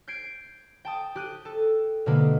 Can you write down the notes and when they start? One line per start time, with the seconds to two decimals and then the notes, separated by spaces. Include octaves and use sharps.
0.08 G6 G#6 C7 D7
0.85 G5 A5 D#6
1.15 G4 F#6 D#7
1.45 A4
2.06 B2 D3 G#3 A#3 B4